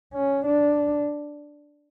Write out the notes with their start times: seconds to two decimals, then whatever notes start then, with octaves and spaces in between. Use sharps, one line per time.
0.14 C#4
0.45 D4